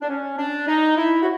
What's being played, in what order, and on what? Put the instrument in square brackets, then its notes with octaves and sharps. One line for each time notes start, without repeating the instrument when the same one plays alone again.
[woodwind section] D4
C#4
D4
D#4
E4
F#4